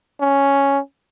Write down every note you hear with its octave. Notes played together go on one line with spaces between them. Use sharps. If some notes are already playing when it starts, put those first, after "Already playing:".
C#4